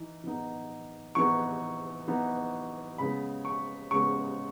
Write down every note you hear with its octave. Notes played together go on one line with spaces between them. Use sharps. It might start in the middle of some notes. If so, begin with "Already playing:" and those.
Already playing: E3 D#4
E3 B3 D#4
E3 B3 D#4 C#6
E3 B3 D#4
C#3 G#3 B3 B5
C#6
C#3 G#3 B3 C#6